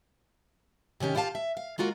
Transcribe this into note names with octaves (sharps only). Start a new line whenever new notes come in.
C3 D#3 C#4 G4
E4 F4 G4 F5 A5
E5
F5
G#3 A#3 F4 F#4 A#4